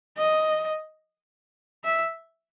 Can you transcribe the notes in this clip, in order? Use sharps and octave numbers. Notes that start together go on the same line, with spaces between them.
D#5
E5